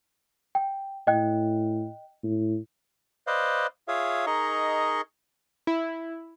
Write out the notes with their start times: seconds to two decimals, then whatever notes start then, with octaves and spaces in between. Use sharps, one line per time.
0.55 G5
1.07 A2 D#5 G5 F#6
2.24 A2
3.27 B4 C5 D5 D#5 F5
3.88 F4 G#4 C#5 E5 F5
4.27 D#4 G#4 A#4 D#5 C#6
5.67 E4